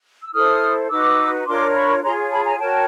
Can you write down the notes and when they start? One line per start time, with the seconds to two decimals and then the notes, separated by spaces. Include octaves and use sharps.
0.22 E6
0.33 E4 A4 C5 D#6 F6
0.90 D#4 F#4 B4 D6 E6
1.46 D4 F4 A#4 C#5 C6 D6
1.74 B5 C#6
2.02 F4 G#4 C#5 A#5 C6
2.31 A5 B5
2.45 G#5 A#5
2.59 F#4 A#4 C#5 G5 A5